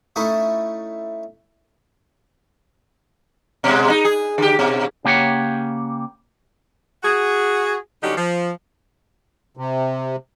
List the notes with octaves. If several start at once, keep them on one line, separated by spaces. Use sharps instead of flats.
A3 C#4 D#4 E4 A4
B2 G#3
D#4
G#4
D3 G4
B2
C#3 A#3 G4 C#5 F#5
F#4 G#4
D3 F#3 G3 C#4 D#4 G4
F3
C3